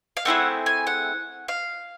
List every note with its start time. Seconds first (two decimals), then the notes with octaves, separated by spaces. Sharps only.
0.17 F5
0.25 A3 C4 E4 G#4 F#5
0.66 G#5
0.87 F#5
1.48 F5